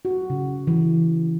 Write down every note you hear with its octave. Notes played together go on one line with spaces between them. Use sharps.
F#4
C#3
E3